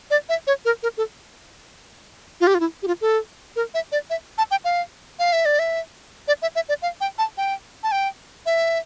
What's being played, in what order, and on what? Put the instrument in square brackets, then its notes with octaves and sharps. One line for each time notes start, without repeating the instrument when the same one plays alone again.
[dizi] D5
E5
C#5
A#4
A#4
A4
F4
G4
F4
E4
G4
F4
A4
A#4
E5
D5
E5
A5
G5
F5
F5
E5
D5
E5
D5
E5
E5
D5
F5
G5
A5
G5
A5
G5
E5